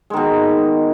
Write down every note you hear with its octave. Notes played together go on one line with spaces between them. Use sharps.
B2 D#3 G#3